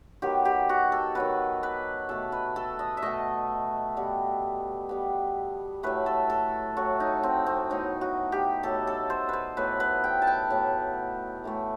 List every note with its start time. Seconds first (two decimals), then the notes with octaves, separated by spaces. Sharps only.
0.22 D#3 F#3 B3 G4
0.45 G4
0.69 F#4
0.92 A4
1.15 D#3 F#3 B3 B4
1.63 B4
2.09 B2 A3 A4
2.32 B4
2.56 A4
2.79 D#5
2.97 E5
3.02 B2 A3 D#5
3.96 B2 G3 B3
4.89 B2 G3 B3
5.83 A2 F#3 A3 B4
6.06 A4
6.30 A4
6.77 A2 F#3 A3 F#4
7.00 D#4
7.23 C4
7.47 C4
7.70 A2 F#3 B3 D#4
8.01 F#4
8.32 G4
8.63 A2 F#3 B3 A4
8.87 A4
9.10 C5
9.29 B4 C5
9.57 A2 F#3 B3 B4
9.80 B4
10.04 G5
10.22 A5
10.27 G5
10.50 A2 F#3 B3
11.44 A2 E3 A3